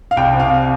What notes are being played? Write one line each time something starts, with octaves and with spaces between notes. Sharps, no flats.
F5
C2 G5
C3
F5